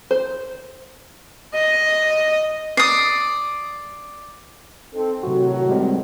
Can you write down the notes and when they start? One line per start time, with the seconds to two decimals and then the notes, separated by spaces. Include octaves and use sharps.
0.11 C5
1.55 D#5
2.77 D5 D#6 C7
4.93 C4 D#4 A4
5.23 A2 C3 D#3 F#3 F#4
5.69 G3 G#3 C4